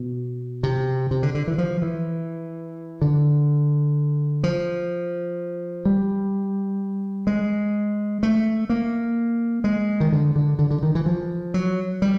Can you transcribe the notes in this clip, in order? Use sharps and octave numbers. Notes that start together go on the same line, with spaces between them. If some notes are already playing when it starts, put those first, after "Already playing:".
Already playing: B2
C3
C3
D3
D3
E3
F3
E3
D3
F3
G3
G#3
A3
A#3
G#3
D#3
D3
D3
D3
D3
D#3
E3
F3
F#3
G3